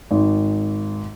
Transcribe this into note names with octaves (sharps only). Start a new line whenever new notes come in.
G#1